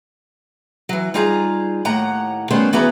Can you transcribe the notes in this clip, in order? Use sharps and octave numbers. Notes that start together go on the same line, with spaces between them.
E3 F#3
G3 D#4 F4 G#4 A#5
D#2 A2 F#5 A#5
D#3 G3 A3 B3 C#4 C5
E3 B3 F#4 G#4 B4 A#5